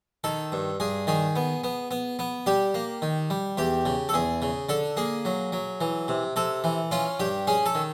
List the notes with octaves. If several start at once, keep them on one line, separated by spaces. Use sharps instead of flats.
D#3 A4
G2
G2 G#4
D#3 G#4
B3
B3
B3
B3
G3 G4
A#3
D#3
G3
E2 G4
C#3
A4
E2 G#4
C#3
D3 A4
A#3 G#4
F#3
F#3
E3
C3
C3 A4
E3
C#4 F4
G2 G4
C#4 G#4
A4
D#3